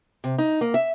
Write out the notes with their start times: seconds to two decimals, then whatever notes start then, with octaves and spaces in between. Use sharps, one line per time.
0.24 C3
0.38 D#4
0.61 A#3
0.74 E5